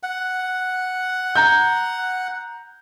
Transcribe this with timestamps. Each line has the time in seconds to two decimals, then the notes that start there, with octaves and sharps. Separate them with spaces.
0.03 F#5
1.36 A#5 G6